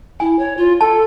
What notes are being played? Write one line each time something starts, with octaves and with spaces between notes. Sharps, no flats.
E4 G#5
C#5
F4
A4 A5